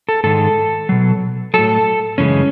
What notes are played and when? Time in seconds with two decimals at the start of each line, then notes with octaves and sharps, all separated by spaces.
0.09 A4
0.24 G#2 D#3 G#3 A4
0.89 B2 F#3
1.54 A2 F#3 A4
2.18 F#2 C#3 E3 G#3 C#4